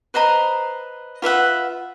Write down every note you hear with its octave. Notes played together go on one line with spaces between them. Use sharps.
B4 C5 D#5 A#5
F4 B4 E5 F#5